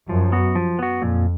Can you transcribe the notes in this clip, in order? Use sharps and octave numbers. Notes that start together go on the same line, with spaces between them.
F#2 F3
B3 F#4
F3
B3 F#4
F2 A#2